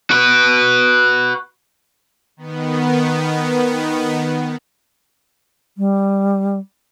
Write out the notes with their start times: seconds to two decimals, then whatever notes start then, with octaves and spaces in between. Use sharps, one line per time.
0.10 F#4 B4
2.37 D#3 B3
5.78 G3